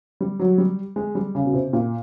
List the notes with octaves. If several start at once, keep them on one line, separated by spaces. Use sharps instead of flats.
G3
F#3
G3
G#3
G3
C#3
B2
C3
A#2